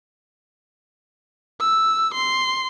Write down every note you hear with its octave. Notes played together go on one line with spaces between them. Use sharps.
E6
C6